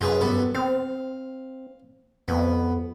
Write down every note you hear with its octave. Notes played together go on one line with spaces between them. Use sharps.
F#2 F4 G#4 B4
G2 B3 A4
C4 F5
F2 B3